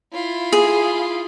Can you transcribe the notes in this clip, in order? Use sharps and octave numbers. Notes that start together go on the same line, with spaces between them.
E4 F4
G#4